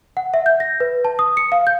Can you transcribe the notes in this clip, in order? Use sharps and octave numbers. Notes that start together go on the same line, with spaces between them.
F#5
E5
G6
A#6
B4
A5
D#6
C#7
F5
G6